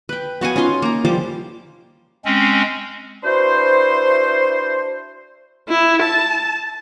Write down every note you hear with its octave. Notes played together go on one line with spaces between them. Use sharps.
B4 G5
B3 F#4 F5 G#5
C#4 D#4 F4 C6
A#3 A#5
F3 G3 C5 D6
G#3 C4 C#4
D4 E4 F#4 B4 C5
E4
A5